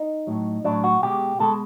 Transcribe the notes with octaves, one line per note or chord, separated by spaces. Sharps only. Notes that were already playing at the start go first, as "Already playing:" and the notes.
Already playing: D#4
A2 F#3
A2 F#3 D4
F#4
B2 G#3 G4
B2 G#3 A4